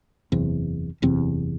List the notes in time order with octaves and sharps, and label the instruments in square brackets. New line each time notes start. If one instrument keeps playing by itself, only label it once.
[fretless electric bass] F#1 E2 C3
F#1 E2 C3 C4